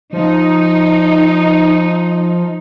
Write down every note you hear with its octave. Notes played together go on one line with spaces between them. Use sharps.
F3 D#4